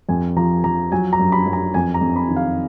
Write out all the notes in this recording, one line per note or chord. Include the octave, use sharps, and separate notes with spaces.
F2 G#5
F3 A#5
F3 A#5
F#3 G#5
A#5
F#2
B5
F#2
A#5
F2 G#5
A#5
F2
B5
D#3
F5